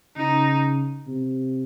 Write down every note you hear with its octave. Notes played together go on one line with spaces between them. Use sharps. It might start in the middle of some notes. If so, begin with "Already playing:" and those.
C#3 D#4
C3